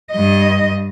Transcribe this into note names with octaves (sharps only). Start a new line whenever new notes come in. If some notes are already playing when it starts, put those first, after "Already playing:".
G2 D#5